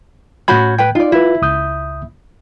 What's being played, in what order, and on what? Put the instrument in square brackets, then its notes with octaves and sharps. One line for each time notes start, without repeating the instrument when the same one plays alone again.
[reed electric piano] A2 G6 G#6 [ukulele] C#4 F#4 B5
[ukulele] B4 G5
[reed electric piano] D#4 [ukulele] F4 D5
[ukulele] E4 [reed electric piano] F4 B4
[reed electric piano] C#2 D#6 G6